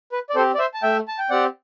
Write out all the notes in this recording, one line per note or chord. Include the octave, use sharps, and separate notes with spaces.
B4
D5
C4 G4 A4 C5
D5
C5 E5
A5
A3 E5 G5
A5
G5
C4 G4 D5 F#5